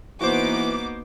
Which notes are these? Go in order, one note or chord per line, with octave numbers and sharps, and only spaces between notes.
E3 A#3 B3 D#4 F#4 C5 D6